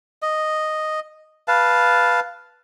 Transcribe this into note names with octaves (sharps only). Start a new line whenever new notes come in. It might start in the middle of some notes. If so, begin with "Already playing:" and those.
D#5
B4 F5 A5